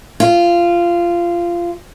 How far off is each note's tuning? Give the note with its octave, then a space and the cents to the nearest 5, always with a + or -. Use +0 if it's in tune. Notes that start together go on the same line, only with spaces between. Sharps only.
F4 -15